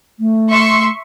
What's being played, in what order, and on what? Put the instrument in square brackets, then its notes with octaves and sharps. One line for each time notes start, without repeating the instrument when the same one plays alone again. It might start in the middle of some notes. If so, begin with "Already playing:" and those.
[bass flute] A3
[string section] E5 C6 C#6